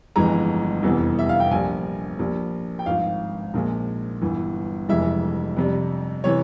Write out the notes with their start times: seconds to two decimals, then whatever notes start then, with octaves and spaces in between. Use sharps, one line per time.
0.16 G1 F2 E3 G#3 A#5
0.83 F1 E2 C3 E3
1.19 E5
1.29 F5
1.40 G5
1.51 A#1 A#2 G3 G#5
2.19 A#1 A#2 G3
2.79 G5
2.86 G#1 G2 F3 F5
3.54 A#1 A#2 G#3
4.21 G1 G2 E3
4.89 F1 F2 E3 G#3 E5
5.57 F2 C3 G3
6.24 C3 E3 C#5